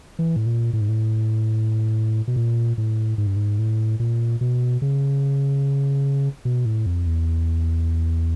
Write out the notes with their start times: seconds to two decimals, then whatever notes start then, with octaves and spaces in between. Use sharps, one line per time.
0.19 E3
0.36 A2
0.46 A#2
0.73 A2
0.81 G#2
0.89 A2
2.28 B2
2.36 A#2
2.78 A2
3.18 G#2
3.27 G2
3.36 G#2
3.59 A2
4.00 A#2
4.41 B2
4.82 C#3
6.45 B2
6.66 A2
6.86 F2
7.06 E2